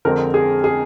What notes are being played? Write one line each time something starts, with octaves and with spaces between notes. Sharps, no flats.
F2 D3 G#3 C4 A#4
G#4
G#4